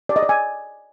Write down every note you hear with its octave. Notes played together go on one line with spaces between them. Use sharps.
D5
D#5
D5
G#5